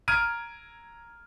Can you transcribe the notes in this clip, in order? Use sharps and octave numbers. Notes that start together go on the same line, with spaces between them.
A#5 F6 G#6 D7 D#7